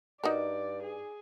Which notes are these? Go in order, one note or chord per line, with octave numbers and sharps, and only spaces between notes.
G2 D#4 F#4 A#4 D5
G#4